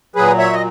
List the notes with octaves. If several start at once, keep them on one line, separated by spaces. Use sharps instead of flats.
A#2 F#3 G#4 B4
C#5 E5
D#5